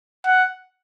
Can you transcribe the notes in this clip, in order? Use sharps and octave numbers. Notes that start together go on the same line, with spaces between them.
F#5